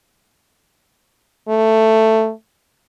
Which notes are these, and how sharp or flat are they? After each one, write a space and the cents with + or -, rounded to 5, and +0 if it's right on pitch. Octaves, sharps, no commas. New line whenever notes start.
A3 +10